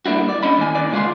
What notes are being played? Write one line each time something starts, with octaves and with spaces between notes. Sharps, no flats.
G3 A#3 D4 E4 F#4
D5
C#4 D4 D#5 B5
D#2 A2 G#5
D#2 D#3 D5
C#3 G#3 F4 C#5 D5 C6